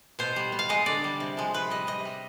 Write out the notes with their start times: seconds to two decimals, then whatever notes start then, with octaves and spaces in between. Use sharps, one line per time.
0.19 B2 C5
0.36 G3
0.52 B2
0.59 F5
0.69 G#3 D#5
0.86 D3 D5
1.04 G3
1.20 C3
1.37 F3 G#3
1.54 C3 B4
1.70 G3 D#5
1.87 C3 D#5
2.05 G3